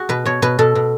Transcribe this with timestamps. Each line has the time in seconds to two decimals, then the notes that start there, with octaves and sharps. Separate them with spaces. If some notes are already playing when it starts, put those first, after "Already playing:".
Already playing: F#4 G#4
0.09 B2 B4
0.26 B2 C#5
0.42 B2 B4
0.59 B2 A4
0.75 B2